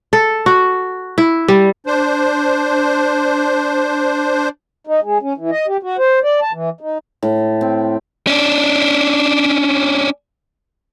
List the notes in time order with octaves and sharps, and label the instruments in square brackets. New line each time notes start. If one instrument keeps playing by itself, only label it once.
[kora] A4
F#4
E4
G3
[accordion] D4 C5
[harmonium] D#4
G#3
C#4
E3
D#5
G4
F#4
C5
D5
A5
E3
D#4
[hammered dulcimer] A2
C4
[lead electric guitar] C#4 D4